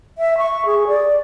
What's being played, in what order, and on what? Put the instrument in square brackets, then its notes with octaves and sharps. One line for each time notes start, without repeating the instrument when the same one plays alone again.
[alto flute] E5
C#6
G#4
D5